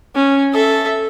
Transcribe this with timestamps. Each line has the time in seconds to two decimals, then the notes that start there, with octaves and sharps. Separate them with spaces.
0.15 C#4
0.53 A4 E5